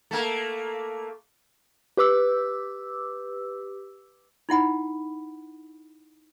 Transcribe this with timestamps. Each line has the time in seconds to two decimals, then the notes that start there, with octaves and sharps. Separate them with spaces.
0.11 A3 A#3
1.97 G4 B4 D6 E6
4.49 D#4 E4 F#5 B5